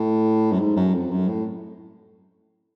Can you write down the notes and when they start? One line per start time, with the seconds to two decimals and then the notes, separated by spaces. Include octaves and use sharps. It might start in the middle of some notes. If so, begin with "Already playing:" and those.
Already playing: A2
0.52 F#2
0.59 G#2
0.76 F#2
0.94 F2
1.12 F#2
1.28 A2